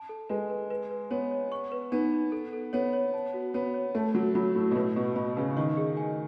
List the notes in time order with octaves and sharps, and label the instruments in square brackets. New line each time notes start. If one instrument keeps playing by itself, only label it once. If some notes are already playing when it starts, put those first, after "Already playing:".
Already playing: [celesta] A5
A4
[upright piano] G#3 [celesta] B4
[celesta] B4
B4
B4
[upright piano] B3 [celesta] C#5
[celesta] C#5
C#6
B4
[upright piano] B3 [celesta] D#4
[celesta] D#4
A4
A4
[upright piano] B3 [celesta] C#5
[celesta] C#5
A5
F#4
[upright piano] B3 [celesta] C#5
[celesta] C#5
[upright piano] A3 [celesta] A5
[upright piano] F#3 [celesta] A4
[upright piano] F#3 [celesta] B5
[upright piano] A2 [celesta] F#4
[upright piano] B2
[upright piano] A2 [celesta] B4
[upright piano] B2 [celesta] B4
[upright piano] B2 [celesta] B5
[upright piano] C#3 [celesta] B4
[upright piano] D#3 [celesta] C#6
[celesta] G#4
G#5